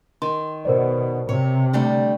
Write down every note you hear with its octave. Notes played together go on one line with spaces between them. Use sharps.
D#3 C6
B2 A#4 C5 D5
C3 C#5
D3 G3 A3